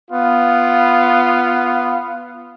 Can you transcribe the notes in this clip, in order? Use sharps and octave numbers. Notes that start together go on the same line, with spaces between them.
B3 F4